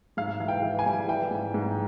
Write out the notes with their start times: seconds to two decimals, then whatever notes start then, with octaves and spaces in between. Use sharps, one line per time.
0.17 G#2 F5
0.40 E3 F5
0.48 G5
0.63 E3
0.79 G#5
0.86 G3
1.08 E3 G5
1.31 G#2
1.54 G#2